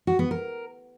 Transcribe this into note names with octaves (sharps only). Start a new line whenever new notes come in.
F#4
B3
A#4